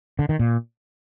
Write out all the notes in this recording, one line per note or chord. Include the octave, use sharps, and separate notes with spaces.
D3
D#3
A#2